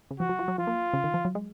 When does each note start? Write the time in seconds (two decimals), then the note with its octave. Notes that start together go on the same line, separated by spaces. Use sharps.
0.11 C#3
0.20 F3 F#4
0.29 F#3
0.39 F3
0.48 F#3
0.58 F3 F4
0.67 A#3
0.93 C#3
1.04 D#3
1.14 F3
1.25 F#3
1.35 G#3